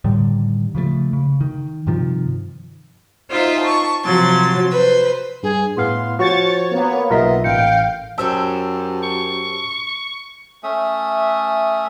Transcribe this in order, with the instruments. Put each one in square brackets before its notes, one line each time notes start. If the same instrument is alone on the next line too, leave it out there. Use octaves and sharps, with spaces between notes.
[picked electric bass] A2 D3 D#3 G3
C#3 F3 G3 A3
C#3
D#3
G2 C3 D#3 F3
[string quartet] D#4 F4 C5 E5
A5 C#6
C3 F3 F#3 C6 A6
B4 C5
[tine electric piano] G2 [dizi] G#4
[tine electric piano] A2 B3 F5 [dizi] C6
[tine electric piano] F3 C5 [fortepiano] F#4 [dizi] C#5 [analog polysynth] C#6 A6
[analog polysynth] A#3 B3
[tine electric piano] B1 F4 B6 [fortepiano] A#4 E5 [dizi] D#5
[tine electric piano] A1 C#7 [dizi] F5 [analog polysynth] G5
[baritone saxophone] F#2 [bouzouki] G4 C5 C#5 [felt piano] A5 E6
[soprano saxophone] C#6
[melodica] A3 C#4 E5 D#6